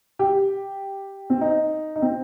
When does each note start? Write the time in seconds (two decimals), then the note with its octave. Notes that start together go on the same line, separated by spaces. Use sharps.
0.19 G4
1.30 C4
1.41 D#4
1.96 D#4
2.02 C4